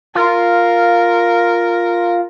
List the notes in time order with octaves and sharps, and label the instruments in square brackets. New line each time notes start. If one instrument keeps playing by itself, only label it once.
[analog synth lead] F4 [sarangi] A#4